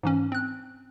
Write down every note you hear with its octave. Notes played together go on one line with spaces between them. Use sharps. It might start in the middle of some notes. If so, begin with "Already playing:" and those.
G#2 E3 C#4
C4 F#6